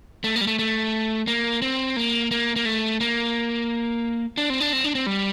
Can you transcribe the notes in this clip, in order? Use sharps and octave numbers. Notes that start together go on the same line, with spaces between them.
A3
A#3
G3
A3
A3
A#3
C4
A#3
A#3
A#3
A3
A#3
D4
C4
D4
C4
D4
C4
G3